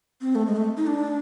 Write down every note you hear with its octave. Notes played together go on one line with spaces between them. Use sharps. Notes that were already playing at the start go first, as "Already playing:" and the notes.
C4
A3
G#3
A3
D#4
D4